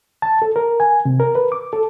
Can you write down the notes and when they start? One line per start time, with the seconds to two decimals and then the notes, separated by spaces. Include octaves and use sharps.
0.22 A5
0.42 A4
0.56 A#4
0.80 G#5
1.05 C3
1.20 A#4
1.35 B4
1.52 D6
1.73 A4